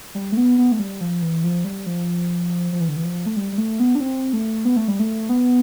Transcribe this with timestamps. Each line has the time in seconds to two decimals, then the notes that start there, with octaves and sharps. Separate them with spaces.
0.15 G3
0.32 A3
0.37 B3
0.58 B3
0.72 A3
0.79 G3
1.01 F3
1.22 E3
1.44 F3
1.65 G3
1.86 F3
2.72 F3
2.80 E3
2.89 D3
2.96 E3
3.05 F3
3.26 A3
3.37 G3
3.52 G3
3.58 A3
3.80 B3
3.95 D4
4.00 C4
4.33 A3
4.65 B3
4.76 A3
4.88 G3
5.00 A3
5.29 B3